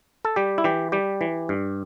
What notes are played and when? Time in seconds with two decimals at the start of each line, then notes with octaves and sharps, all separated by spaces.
0.25 A4
0.36 G3 G4
0.58 E4
0.64 E3 G4
0.92 G3 G4
1.21 E3
1.49 G2